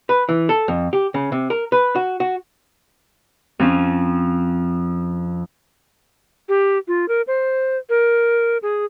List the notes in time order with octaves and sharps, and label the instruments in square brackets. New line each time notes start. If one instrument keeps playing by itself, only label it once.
[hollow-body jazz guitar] B4
E3
A4
F2
G4
C#3
C3
A#4
B4
F#4
F#4
[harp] F2 F3 C#4
[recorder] G4
F4
A#4
C5
A#4
G#4